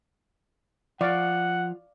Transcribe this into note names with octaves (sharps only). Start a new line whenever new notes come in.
F3 D5 F5 F#5 C#6